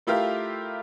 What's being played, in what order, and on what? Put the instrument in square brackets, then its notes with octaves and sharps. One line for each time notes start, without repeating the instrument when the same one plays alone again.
[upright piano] A3 E4 F4 G4 A#4 F5